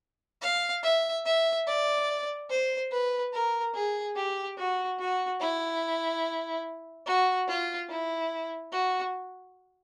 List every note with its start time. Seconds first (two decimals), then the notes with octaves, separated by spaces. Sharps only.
0.42 F5
0.83 E5
1.25 E5
1.67 D5
2.50 C5
2.91 B4
3.33 A#4
3.75 G#4
4.16 G4
4.58 F#4
4.99 F#4
5.40 E4
7.06 F#4
7.48 F4
7.89 E4
8.72 F#4